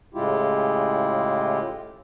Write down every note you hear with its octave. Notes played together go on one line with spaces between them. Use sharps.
A2 C#3 G#3 E4 F4 G4